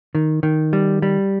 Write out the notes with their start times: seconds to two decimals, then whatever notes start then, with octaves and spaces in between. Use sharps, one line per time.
0.15 D#3
0.43 D#3
0.73 G3
1.02 G3